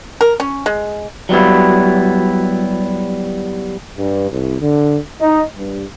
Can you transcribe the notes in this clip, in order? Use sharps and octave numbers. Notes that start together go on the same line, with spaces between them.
A#4
C#4
G#3
F#3 G3 B3 E4
G2
C2
D3
D#4
G2